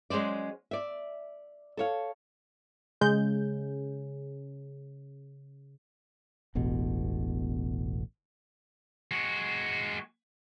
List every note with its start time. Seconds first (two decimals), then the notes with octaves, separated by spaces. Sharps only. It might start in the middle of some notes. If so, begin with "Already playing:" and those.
0.10 F#3 G#3 C#4 C5 D5
0.71 D5 E5
1.77 A4 C#5 F5
3.01 C#3 G#3 G6
6.55 E1 A1 B2
9.11 G#3 F#4